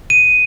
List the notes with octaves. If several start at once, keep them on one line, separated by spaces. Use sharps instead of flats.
D#7